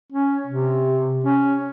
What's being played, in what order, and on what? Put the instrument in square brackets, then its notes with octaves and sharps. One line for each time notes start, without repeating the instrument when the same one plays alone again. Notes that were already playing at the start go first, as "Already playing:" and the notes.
[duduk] C#4
C3
C#4